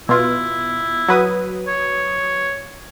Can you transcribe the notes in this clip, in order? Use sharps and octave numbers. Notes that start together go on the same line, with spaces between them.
B2 E4 F4
F#3 B4 D#6
C#5